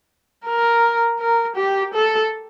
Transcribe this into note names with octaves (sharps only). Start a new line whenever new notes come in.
A#4
A#4
G4
A4